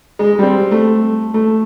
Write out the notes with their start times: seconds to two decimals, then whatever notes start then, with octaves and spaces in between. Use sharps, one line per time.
0.19 G#3
0.39 G3 C4
0.71 A3
1.34 A3